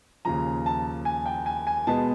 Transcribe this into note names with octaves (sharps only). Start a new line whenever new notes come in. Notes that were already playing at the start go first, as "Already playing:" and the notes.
D#2 C#3 F3 A#5
A5
G#5
G5
G#5
G#5
B2 G#3 B3 A5